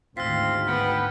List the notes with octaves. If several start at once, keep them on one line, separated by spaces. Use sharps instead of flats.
G#1 D2 C4 F4 F5 F6 B6
B3 F#5 G5